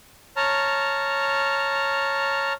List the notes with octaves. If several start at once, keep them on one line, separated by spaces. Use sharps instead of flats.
C#5 A5 A#5 F6